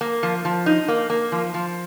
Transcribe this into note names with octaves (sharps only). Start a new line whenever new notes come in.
A#3
F3
F3
D#4
A#3
A#3
F3
F3